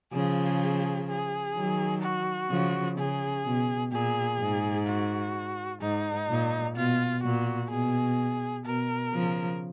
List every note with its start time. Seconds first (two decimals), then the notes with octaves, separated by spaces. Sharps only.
0.13 C#3 F3 G#4
1.09 G#4
1.55 D#3 F#3
2.02 F#4
2.50 C#3 F3
2.98 C#3 G#4
3.45 B2
3.92 A#2 G#4
4.40 G#2
4.87 F#4
5.81 G#2 D#4
6.29 A#2
6.76 B2 F4
7.23 A#2 F#4
7.71 B2 G#4
8.66 B2 A#4
9.13 C#3 F3